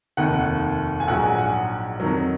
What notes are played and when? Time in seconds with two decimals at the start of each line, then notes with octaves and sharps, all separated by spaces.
0.17 F1 D#2 D#3 F#5
1.00 G#5
1.08 A#1 G#2 F#3 F#5
1.24 G#5
1.38 F#5
2.00 F2 D#3 F#3